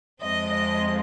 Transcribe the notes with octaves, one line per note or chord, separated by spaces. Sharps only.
F2 F3 G#3 C4 D#5
D#5